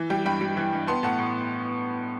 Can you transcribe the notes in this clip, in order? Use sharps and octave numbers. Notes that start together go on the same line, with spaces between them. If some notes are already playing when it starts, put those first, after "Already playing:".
Already playing: E3
G3 G5
G2 G5 B5
G3
E3
G2
B3 A5 C6
A2 F#5 A5
A2